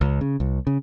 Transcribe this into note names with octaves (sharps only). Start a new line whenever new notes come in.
C#2
C#3
C2
C#3